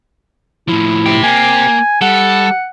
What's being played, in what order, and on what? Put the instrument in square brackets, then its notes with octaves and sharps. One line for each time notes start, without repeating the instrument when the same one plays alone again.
[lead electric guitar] A2 F3 [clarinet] E4
[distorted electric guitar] C4 G4
[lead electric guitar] A#3 [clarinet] G#5
[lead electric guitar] G3 [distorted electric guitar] A4 [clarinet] F#5